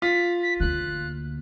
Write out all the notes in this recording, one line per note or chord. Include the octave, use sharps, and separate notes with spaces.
F4 B6
B6
D2 A#3 F#6